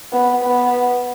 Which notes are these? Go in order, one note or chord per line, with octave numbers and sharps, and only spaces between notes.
B3
B3